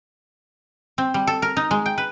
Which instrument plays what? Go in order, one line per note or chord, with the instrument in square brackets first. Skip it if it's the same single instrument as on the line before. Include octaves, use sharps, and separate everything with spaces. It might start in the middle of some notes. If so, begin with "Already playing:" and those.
[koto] C4
G3
A4
A#4
D#4
G#3
G5
B4